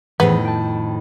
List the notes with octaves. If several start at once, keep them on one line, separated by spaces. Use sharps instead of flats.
F2 A2 D#3 E3 B3 G#4 C5
G5 A5